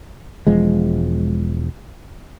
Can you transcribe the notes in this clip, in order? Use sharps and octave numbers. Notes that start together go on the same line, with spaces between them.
E1 F3 G#3